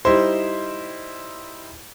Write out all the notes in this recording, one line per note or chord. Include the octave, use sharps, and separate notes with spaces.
G3 D#4 E4 C5